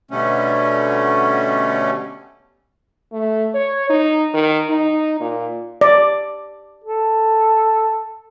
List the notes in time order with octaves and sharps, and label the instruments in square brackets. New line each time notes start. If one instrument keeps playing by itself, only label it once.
[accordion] B2 D3 G3 A3 C#4
[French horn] A3
C#5
D#4
D#3
D#4
A#2
[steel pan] D5
[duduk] A4